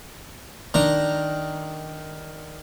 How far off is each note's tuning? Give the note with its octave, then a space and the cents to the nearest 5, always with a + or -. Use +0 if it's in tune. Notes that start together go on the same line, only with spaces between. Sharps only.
D#3 +0 D4 +0 A#5 +0